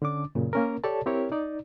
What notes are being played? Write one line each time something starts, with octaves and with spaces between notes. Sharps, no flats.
D3 C#4 D4 D6
F#2 A#2 C#3
A#3 C#4 A#4
G4 A4 C#5 D5 A5
C4 E4 G4 A#4 C#5
D#4 D5